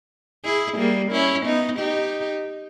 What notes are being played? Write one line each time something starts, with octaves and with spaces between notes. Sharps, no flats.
E4 G#4
G3 A#3
C#4 E4
B3 D#4
D#4 G4